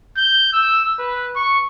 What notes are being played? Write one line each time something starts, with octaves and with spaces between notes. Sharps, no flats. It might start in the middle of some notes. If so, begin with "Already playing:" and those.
G6
E6
B4
C#6